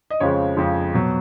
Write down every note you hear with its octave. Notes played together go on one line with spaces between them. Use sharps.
D#5
F2 C#3 F3 G#3 C#5
F2 C#3 F3 G#3
B2 F#3